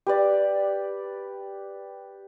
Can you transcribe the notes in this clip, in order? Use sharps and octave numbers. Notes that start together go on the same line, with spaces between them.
G4 B4 D5